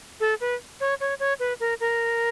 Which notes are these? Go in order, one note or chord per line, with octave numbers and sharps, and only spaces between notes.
A4
B4
C#5
C#5
C#5
B4
A#4
A#4